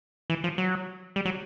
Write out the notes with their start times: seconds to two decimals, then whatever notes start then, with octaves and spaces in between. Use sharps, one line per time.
0.30 E3
0.44 F3
0.58 F#3
1.16 G3
1.25 F#3